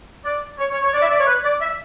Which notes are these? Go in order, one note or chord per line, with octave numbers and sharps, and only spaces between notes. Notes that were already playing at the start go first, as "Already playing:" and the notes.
D5
C#5
C#5
C#5
D5
E5
D5
C#5
B4
D5
E5